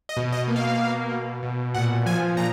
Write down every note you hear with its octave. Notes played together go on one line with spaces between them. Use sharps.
D#5
B2
D#5
A#3
F5
B2
B2
B2
A#2 F#5
F3 G#5
A#2 A#5